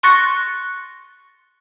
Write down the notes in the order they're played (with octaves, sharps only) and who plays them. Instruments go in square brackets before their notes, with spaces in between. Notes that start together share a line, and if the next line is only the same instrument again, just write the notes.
[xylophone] C6 C#6 F#6 A6 A#6 C#7